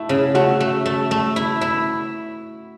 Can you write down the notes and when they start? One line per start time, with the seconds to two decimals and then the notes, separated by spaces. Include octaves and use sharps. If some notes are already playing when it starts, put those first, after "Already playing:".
Already playing: A3 E4
0.09 C#3
0.35 A3 F#4
0.60 A3
0.86 A3
1.11 A3
1.36 E4
1.61 E4